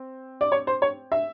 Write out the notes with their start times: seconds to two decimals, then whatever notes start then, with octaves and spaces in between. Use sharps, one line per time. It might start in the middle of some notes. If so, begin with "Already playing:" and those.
Already playing: C4
0.41 D5
0.52 C#5
0.67 C5
0.82 C#5
1.12 E5